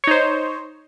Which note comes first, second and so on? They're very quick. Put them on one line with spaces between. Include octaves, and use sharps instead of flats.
C#5 D#4 C5